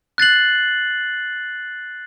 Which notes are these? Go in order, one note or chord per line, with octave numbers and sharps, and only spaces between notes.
F#6 A6 C7 F#7